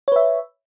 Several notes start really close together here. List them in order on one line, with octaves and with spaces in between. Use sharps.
C#5 B4 E5